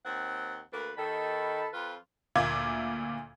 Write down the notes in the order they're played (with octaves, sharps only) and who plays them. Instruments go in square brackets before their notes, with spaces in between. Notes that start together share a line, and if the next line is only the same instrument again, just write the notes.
[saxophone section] D#2 C4 F#5
D2 A#3 B4
[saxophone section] D#2 D#3 [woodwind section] A4 A5 B5
[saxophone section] F2 F4 B4
[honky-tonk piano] D2 A#2 A#3 E5 D6 G#6